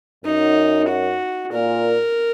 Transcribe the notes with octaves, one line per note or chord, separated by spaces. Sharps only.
F#2 D#4
F#4
A#2 A#4